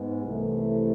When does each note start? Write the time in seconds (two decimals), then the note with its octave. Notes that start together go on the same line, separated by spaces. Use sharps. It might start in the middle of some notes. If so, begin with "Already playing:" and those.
Already playing: G#2 G#3 B3
0.26 C2 C3 E3 A3